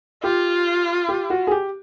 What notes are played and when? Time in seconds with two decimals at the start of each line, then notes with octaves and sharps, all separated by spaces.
0.23 F4 G4
1.09 G4
1.30 F#4
1.47 G#4
1.51 G4